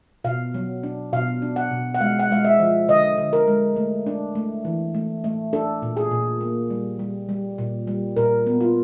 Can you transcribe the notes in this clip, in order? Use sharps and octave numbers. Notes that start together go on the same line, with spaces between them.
B2 F5
F#3
D4
B2 F5
D4
F#5
B2
F#5
G#3 F5
F#5
G#3 F5
E5
F3
D3 D#5
D3
A#4
G#3
A3
D4
A3
E3
A3
A3
D4 A4
A#2
G#4
A#2
A#3
G3
G3
G3
A#2
G3
A#2 A#4
B3
F4